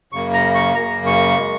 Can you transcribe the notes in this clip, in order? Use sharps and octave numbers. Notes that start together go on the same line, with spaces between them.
F#2 C#3 A#3 C#6
A#5
C#6
F#2 C#3 A#3 A#5
C#6
G#3